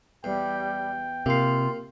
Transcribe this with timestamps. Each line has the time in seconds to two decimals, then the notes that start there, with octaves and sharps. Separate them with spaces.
0.24 E2 G3 G5
1.26 C3 A#3 F4 F5